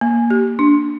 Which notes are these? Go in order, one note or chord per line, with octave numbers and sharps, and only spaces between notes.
A#3
G4
D4